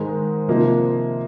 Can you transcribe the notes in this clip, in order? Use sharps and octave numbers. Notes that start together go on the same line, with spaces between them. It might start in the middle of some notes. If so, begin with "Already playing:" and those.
Already playing: G#2 D#3 G#3
C3 F3 A#3 D#4